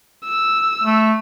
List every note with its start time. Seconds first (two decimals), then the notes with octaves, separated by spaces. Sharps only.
0.24 E6
0.83 A3